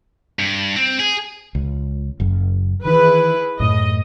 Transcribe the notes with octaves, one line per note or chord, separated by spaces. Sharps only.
G2
C4
G#4
C#2
F#1 F#2
D#3 E3 E4 G#4 B4
F#2 A2 D#5